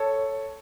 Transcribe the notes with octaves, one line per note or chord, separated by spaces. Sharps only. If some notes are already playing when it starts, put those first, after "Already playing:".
Already playing: A4 C#5